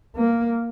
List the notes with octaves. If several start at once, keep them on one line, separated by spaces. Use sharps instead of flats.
A#3